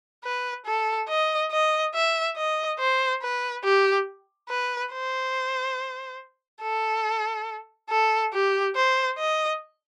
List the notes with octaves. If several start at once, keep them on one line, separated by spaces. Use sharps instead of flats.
B4
A4
D#5
D#5
E5
D#5
C5
B4
G4
B4
C5
A4
A4
G4
C5
D#5